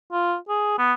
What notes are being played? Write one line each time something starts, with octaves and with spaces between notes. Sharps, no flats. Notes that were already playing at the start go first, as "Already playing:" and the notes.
F4
G#4
B3